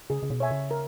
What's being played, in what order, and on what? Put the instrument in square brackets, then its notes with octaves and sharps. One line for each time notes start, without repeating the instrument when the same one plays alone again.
[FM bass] C#3 [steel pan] G#4
[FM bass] C#3
B2
[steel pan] C#5 E5 G#5
[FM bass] C#3
[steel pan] A#4